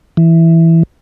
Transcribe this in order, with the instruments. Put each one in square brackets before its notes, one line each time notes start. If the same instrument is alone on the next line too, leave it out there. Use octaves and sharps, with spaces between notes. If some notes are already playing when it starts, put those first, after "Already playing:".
[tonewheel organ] E3